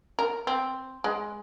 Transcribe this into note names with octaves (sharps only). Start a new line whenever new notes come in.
A#4
C4
G#3